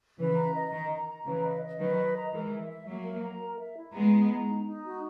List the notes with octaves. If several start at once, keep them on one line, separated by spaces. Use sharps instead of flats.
C#3 E3 B4
A#5
D#5
D#3 A#5
A#5
A#5
C#3 E3 B4
D#5
D#5
D#3 F#3 B4
D#5
A#5
E3 G#3 A#4
E5
E5
F#3 A#3 E5
A#4
A#5
A#4
E5
E4
G#3 B3 A#5
E4
A#5
D#4
D#4
F#4